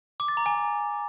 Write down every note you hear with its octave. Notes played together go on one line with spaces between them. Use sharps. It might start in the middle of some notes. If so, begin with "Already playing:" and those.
D6
A6
A#5
G#5